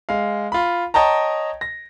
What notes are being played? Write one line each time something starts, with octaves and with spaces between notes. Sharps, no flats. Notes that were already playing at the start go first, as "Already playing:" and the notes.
G#3 F5
F4 B5
C#5 D#5 G5 A5 A#5
A#6